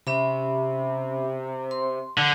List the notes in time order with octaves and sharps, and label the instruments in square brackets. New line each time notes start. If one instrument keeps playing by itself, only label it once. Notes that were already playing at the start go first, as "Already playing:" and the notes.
[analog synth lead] C3 [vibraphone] C#4 E5 B5
[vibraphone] C6
[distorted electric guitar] D3